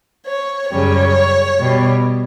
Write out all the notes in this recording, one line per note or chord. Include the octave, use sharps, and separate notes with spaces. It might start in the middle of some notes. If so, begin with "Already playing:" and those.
C#5
F#2 C#3 G3 C#5
B2 G3